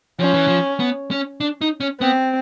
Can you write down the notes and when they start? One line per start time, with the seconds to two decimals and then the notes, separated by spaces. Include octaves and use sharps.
0.20 F3 C#4
0.34 E3
0.47 F3
0.80 B3
1.11 C#4
1.41 D4
1.61 D#4
1.80 C#4
2.01 B3 C4